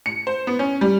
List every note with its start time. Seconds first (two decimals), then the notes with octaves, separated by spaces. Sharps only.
0.06 C#7
0.27 C5
0.47 B3
0.59 C#4
0.81 G3